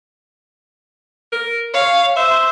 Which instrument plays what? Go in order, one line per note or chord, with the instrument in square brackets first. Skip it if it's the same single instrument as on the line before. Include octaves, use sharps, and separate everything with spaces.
[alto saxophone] A#4
[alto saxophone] C#5 [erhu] F5
[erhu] C5 [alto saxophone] E5